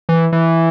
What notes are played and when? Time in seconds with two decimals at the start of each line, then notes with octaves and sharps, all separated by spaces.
0.09 E3
0.32 E3